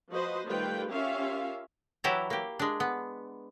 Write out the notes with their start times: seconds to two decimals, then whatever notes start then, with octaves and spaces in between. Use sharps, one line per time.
0.12 F3 F#4 B4 C5 D#5
0.46 D#3 G3 A3 F4 B4 G5
0.91 C#4 F4 G4 A#4 E5 F5
2.04 E3 F#3 E4 G4 A5 A#5
2.30 A#3 G4
2.59 G#3 D4
2.80 B3